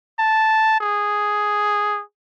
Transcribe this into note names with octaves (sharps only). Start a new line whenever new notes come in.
A5
G#4